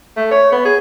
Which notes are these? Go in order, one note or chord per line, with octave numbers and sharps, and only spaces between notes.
A3
C#5
B3
G#4